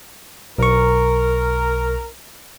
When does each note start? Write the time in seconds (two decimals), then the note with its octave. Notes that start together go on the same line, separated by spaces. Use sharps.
0.58 B1 A#4 C#6